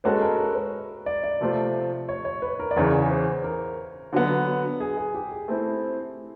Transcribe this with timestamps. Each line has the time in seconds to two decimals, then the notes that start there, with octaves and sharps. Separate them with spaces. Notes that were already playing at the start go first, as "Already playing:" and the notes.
0.04 G#3 C#4 F#4 A4 B4
0.21 A#4
0.38 A#4
0.55 B4
1.06 D5
1.24 D5
1.41 C3 F3 A3 C4 F4
2.09 C#5
2.25 C#5
2.42 B4
2.60 A#4
2.71 D5
2.76 E2 C#3 E3 C#5
3.10 C5
3.44 A#4
4.13 D3 F#3 B3
4.80 G#4
4.97 G#4
5.14 G4
5.31 G#4
5.48 A3 C4 E4